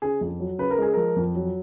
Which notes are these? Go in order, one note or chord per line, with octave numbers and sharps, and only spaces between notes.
C#3 G#4
F2
F#3
C#3 B4
A#4
G#3 G#4
F3 A#4
F2
F#3